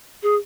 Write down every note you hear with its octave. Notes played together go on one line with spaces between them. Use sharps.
G#4